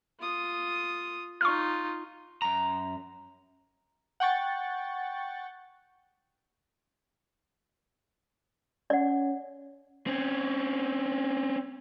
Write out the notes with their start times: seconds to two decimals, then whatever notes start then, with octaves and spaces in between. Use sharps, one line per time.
0.20 F4 D#6
1.41 D#4 F4 C#6 F6
2.42 F#2 A#5
4.20 F#5 G5 C#6 A6
8.90 C#4 D5 F#5
10.07 C4 C#4